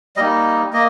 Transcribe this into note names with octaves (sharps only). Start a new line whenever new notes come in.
G3 A#3 D#4 D#5
A#3 D#5